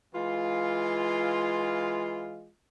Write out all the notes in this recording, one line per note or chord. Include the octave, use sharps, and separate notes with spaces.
E3 G#3 F4